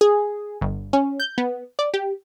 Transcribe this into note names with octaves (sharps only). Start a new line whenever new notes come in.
G#4
G1
C#4
G6
B3
D5
G4